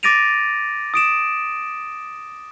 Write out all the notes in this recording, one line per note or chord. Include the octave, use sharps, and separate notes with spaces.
D6 A6 A#6 D7 D#7 F7
D#6 D7 E7